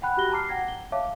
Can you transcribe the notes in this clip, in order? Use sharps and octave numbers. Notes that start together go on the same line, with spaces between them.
F#5 G5 B5 F#6
F#4 G4 B5 F#6 A#6 G7
A5 A#5 D6 F6 C7
F#5 G5 G#6 A#6
G7
C#5 E5 F5 A5 D6